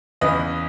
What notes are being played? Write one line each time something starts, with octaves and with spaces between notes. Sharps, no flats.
E2 C#3 E3 B4 D#5